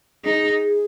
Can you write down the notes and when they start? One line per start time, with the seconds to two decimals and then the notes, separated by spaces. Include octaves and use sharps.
0.25 D#4 G#4